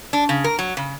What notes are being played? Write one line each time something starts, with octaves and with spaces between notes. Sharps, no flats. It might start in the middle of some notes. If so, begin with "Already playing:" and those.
D4
C#3
A#4
F#3
C#3